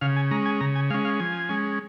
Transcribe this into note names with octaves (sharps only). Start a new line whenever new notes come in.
C#3 F5
G#5
G#3 C#4 A#5
G#5
C#3 A#5
G#5
G#3 C#4 F5
F5
F3 G#5
G#3 C#4